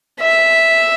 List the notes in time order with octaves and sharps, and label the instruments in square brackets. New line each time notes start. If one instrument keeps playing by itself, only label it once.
[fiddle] E5